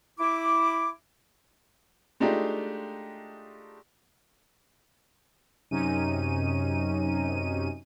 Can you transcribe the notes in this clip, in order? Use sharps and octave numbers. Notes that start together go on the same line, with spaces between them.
E4 D6
G#3 A3 D4 D#4 F4 G4
F#2 C3 C#4 D#4 D#7